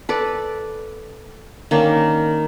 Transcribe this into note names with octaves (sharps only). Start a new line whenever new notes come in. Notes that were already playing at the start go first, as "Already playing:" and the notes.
A4 B4 D5
D#3 A#3 C#4 D4